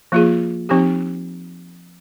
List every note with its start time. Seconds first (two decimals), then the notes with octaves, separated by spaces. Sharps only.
0.12 F3 A#3 F4 G#4
0.69 F3 C4 D#4 G4